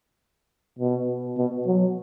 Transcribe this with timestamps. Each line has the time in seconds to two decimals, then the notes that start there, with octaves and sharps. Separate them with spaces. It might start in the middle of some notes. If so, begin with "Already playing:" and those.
0.79 B2
1.38 B2
1.67 F#3